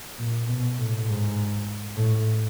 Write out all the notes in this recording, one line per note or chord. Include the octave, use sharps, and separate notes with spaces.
A#2
B2
A2
G#2
A2